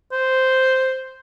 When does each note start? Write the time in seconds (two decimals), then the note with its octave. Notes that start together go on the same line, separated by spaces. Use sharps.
0.12 C5